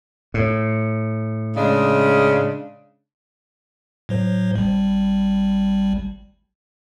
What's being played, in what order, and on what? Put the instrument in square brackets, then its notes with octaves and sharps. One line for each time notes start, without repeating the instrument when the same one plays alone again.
[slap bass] A2
[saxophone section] C#3 G#3 D4
[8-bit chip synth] A2 F#3 C5
G#1 G3